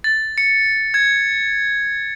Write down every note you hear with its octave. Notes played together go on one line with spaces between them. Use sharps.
A6
C#7
G#6